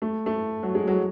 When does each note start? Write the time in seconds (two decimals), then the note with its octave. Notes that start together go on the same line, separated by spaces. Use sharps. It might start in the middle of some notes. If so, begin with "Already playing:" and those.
0.02 A3
0.26 A3
0.63 F#3
0.75 G#3
0.88 F#3